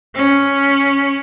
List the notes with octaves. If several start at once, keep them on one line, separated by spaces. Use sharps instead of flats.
C#4